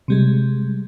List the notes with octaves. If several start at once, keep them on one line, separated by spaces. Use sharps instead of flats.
C3 G3 G#3